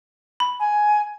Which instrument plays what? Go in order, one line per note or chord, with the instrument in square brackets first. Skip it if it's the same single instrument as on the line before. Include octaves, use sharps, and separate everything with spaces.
[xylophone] B5
[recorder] G#5